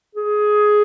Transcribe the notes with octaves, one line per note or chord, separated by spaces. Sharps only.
G#4